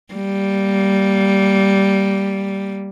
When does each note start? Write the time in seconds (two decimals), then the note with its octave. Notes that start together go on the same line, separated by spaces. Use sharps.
0.13 G3 A#3